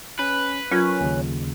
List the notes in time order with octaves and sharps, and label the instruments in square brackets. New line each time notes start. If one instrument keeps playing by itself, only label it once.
[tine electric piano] C#4 [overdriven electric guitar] B4
[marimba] F#3 F4 [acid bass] C#4 [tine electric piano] A#4
[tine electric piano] D#2 C#3